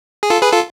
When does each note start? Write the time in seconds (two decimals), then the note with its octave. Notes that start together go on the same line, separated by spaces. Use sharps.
0.23 G#4
0.30 F4 A4
0.42 G#4 B4
0.52 F4 A4